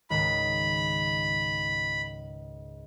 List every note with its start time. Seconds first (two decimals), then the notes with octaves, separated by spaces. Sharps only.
0.10 C#2 G#2 D#3 B5